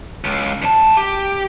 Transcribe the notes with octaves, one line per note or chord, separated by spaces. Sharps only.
C#2
E2 A5
G4